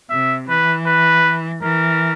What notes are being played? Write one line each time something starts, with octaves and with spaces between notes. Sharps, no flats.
C3 E5
E3 B4
B4
E3 A#4